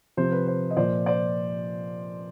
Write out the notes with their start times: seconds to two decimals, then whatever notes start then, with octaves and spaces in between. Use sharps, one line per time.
0.17 C3 F3 C5
0.32 B4
0.48 C5
0.71 D#5
0.76 A#2 F3 C5 D5
1.06 C5 D5